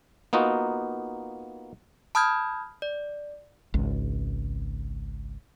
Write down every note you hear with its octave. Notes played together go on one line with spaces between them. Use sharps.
A#3 B3 D#4 F4 F#4
A5 B5 D#6 F6 G6 G#6
D5
G#1 C#2